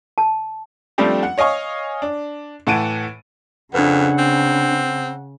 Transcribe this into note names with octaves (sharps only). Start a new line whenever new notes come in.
A5
F3 G3 A3 C4 D4 G4
F#5
C#5 D#5 F5 G#5 C#6
D4
A2 E3 F#5 A5 D7 D#7
F2 C#3 D4 B4 F#5
C4